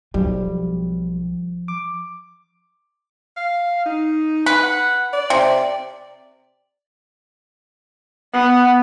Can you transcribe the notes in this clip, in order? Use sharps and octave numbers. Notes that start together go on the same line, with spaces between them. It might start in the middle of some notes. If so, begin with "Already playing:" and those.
B1 F3 G3
D6
F5
D#4
B4
F#5
D5
C3
B3